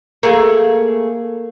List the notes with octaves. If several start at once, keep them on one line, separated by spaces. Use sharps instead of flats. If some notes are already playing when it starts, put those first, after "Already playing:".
A3 A#3 G#4